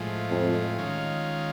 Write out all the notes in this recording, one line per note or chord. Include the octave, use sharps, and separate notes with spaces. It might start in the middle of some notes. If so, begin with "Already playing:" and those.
Already playing: A2 F3 G#3
F2
D#3 G#3 C#4 F4